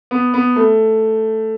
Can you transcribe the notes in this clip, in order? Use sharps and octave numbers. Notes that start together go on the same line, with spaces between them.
B3
B3
A3